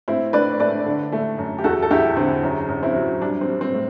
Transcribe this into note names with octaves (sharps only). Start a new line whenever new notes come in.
A2 C4 E4
A2 B4 D5
A3 B4 D5
D3
A3
F#2
G4
E2 F#4 A4
A4
E2 E4 G4
D3 C4 E4
F#2
F#2
C4 E4
F#3
G3 D4
C4
G3
C4
A2